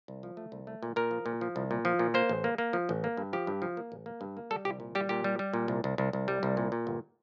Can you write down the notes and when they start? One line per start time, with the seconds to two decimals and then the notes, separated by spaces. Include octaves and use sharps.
0.08 C2
0.23 F3
0.37 A3
0.52 C2
0.67 A3
0.83 A#2
0.96 A#2 A#4
1.11 F3
1.26 A#2
1.41 F3
1.56 C2
1.71 A#2
1.85 F3
1.99 A#2
2.14 A#3 C5
2.29 A1
2.44 A#3
2.58 A#3
2.73 F3
2.89 A1
3.04 A#3
3.17 G2
3.33 F3 G4
3.47 G2
3.62 F3
3.77 A#3
3.92 A1
4.06 A#3
4.21 G2
4.37 A#3
4.51 G3 A4
4.65 C2 G4
4.80 A#2
4.95 G3 G4
5.09 A#2 G4
5.24 G3
5.39 G3
5.54 A#2
5.68 C2
5.84 C2
5.98 C2
6.13 C2
6.28 G3
6.43 C2
6.57 A#2
6.72 A#2
6.87 G1